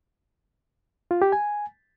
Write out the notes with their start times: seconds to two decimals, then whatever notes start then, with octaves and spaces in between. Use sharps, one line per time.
1.11 F4
1.22 G4
1.32 G#5